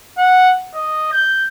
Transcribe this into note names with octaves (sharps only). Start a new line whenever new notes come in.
F#5
D#5
G6